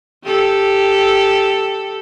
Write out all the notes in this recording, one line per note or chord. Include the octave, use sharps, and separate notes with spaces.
G4 A4